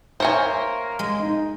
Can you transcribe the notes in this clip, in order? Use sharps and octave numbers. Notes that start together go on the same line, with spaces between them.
A#3 C5 C#5 E5 G#5
G#3
D#4